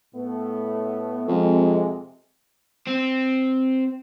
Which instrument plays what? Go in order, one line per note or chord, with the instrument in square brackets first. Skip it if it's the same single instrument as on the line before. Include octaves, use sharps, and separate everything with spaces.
[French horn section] A2 A3 B3
[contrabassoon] F2 [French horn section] C3 G#3
[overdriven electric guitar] C4